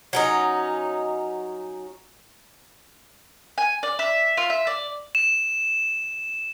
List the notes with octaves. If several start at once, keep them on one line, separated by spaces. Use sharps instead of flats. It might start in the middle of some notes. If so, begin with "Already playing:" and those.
F#3 C#4 D#4
G#5
D5
E5
F4
E5
D5
E7